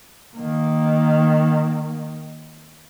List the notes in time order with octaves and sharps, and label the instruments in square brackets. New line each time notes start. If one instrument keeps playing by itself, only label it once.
[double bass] D#3 A#3